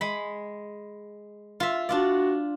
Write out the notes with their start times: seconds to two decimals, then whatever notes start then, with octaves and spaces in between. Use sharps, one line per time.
0.01 G#3 B5
1.60 F4 E5
1.89 D4 F4 F#4 D5